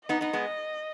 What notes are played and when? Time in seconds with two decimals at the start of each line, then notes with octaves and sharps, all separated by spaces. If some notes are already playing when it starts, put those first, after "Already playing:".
0.09 B3 D#4 D#5
0.21 B3 D#4
0.33 G#3 B3